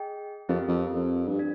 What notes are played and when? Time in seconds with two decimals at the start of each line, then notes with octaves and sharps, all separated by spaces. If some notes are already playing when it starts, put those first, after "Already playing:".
Already playing: G#4 D#5 G5
0.49 F2 C4 G4 A#4 F5
0.68 F2
0.94 F2
1.28 G2
1.39 D4